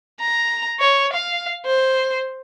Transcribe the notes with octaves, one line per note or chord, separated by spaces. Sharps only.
A#5
C#5
F5
C5